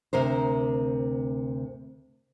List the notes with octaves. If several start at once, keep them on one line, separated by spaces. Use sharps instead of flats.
D2 C3 A#4 C5